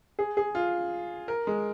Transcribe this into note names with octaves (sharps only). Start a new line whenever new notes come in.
G#4
G#4
F4
A#4
G#3